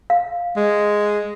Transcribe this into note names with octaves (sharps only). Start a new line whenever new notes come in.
F5
G#3